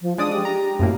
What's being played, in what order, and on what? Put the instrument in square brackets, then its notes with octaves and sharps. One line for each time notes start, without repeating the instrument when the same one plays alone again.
[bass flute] F3
[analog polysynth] G#3 D5 D#6 [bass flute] D4
[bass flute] G4
[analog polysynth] A#5
F#2 A2 A#3